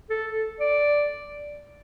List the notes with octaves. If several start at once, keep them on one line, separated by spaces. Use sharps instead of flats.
A4
D5